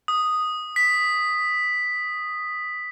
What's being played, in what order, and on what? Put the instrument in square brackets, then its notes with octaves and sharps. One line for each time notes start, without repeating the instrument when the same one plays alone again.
[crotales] D#6
B6